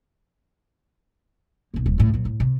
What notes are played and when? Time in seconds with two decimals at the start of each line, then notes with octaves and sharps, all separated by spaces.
1.74 B1 A#3
1.86 D#1 F2
1.98 D2 A2
2.14 A#2 F#3
2.25 A2
2.40 C3